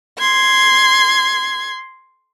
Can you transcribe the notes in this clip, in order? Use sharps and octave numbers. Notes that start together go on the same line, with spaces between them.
C6 G#6